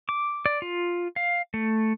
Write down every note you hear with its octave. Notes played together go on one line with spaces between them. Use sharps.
D6
D5
F4
F5
A3